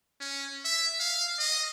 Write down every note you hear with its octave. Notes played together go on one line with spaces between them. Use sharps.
C#4
E5
F5
D#5